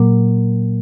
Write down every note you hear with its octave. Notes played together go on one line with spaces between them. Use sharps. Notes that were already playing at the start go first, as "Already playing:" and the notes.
Already playing: A#2 F#3 A#3